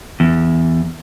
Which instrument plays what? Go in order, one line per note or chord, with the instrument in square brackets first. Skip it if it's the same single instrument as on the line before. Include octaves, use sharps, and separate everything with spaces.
[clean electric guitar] E2